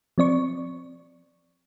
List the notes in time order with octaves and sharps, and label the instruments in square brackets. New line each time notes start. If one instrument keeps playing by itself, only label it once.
[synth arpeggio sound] F3 C4 D5 C#6